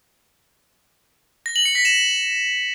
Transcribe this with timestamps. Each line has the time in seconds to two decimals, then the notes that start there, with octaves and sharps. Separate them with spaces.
1.46 A#6
1.56 F#7
1.65 C#7
1.75 B6
1.85 E7